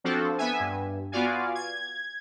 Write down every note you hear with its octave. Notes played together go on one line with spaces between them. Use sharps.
F3 C4 D4 F#4 A4
B3 E5 G#5
G2
B3 F4 F#4 D5 F5 G#5
G#6